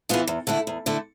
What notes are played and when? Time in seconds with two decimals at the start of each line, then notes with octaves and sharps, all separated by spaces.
0.09 E3 B3 F4 G#4
0.27 E2
0.47 D3 A3 E4
0.67 E2
0.86 D3 A3 E4